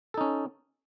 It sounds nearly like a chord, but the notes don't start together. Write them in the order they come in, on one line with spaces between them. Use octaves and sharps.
A4 D#4 C#4